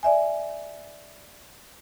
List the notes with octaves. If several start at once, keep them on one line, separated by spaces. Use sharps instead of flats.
D5 E5 G#5